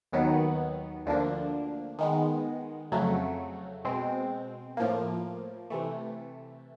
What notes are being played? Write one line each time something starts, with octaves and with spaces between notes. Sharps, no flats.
D#2 D#3 F#3 B3
D2 D3 F3 A#3 D4
D#3 G#3 B3
F2 C#3 F#3 A3
B2 G#3 C4
A2 F3 A#3
C3 E3 A3